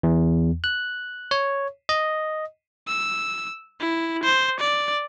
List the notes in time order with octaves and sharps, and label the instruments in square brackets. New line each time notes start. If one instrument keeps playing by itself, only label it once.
[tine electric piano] E2
F#6
C#5
D#5
[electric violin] E6
E4
C5
D5